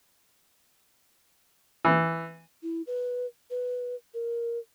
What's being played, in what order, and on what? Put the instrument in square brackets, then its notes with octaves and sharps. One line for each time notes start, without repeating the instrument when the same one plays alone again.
[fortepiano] E3
[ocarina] E4
B4
B4
A#4